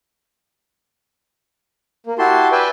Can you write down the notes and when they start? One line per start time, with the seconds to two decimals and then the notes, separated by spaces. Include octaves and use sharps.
2.06 A#3
2.19 E4 F#4 G4 A5 C6
2.52 B4 D5 E5 G5 G#5